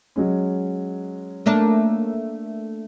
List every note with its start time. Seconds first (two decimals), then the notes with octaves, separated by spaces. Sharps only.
0.16 F#3 G#3 C#4
1.46 A3 A#3 D4